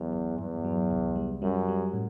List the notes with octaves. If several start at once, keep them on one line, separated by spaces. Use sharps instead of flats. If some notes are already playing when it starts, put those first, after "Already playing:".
Already playing: E2 F#3
G1
E2 G2
F#3
C2
G3
F#2 G3
G3
A2